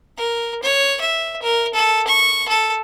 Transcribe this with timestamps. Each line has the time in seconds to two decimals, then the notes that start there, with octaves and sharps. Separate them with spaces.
0.18 A#4
0.63 C#5
1.01 E5
1.43 A#4
1.74 A4
2.08 C#6
2.49 A4